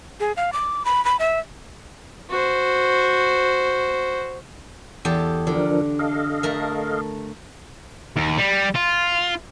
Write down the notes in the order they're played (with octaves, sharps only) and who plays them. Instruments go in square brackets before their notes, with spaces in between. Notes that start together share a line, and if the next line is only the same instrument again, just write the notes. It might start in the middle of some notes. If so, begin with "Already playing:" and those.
[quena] G#4
F5
D6
B5
B5
E5
[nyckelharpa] F#4 C5
[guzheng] E2 G4 A4
[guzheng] D3 [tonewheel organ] F3 D4 A#4
[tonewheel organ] A4 D#5 F5
[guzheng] A3 A#4
[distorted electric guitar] D#2
G3
F4